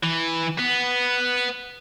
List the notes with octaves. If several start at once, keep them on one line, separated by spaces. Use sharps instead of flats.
E3
B3